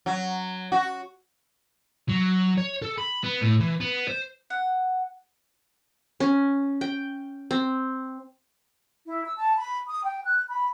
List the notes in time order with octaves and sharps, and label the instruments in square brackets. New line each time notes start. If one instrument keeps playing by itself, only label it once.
[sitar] F#3
F#4
[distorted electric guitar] F#3
C#5
A4
B5
B3
A2
E3
B3
C5
[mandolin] F#5
[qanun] C#4
G5
C4
[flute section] E4
E6
A5
B5
D#6
G5
F#6
B5